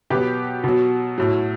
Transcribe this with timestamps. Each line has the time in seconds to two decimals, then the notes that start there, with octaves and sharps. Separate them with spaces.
0.10 B2 F#3 G4 B4
0.64 B2 F#3
1.18 A2 F#3